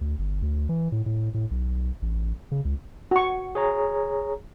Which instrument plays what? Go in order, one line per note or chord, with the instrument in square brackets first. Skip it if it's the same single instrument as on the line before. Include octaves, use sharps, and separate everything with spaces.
[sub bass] D2
G1
D2
E3
A2
A2
A2
B1
A1
C#3
C#2
[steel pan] F#4 C#6
[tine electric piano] G#4 C#5 A#5